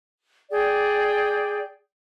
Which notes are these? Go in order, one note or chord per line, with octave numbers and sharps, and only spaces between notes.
G#4 D5 G5